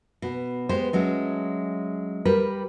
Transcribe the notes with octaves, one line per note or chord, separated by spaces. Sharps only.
B2
G#3 B3 G4 C5
F#3 G#3 A3 C#4
G3 G4 A#4 B4